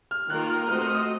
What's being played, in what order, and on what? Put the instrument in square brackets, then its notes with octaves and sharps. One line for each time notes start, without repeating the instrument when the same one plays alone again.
[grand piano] F6
[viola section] D#3 A#3 F4 A#4 [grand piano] F#6
[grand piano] F6
[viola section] A3 C4 F#4 C5 D#5 [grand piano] F6
[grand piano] F6
D#6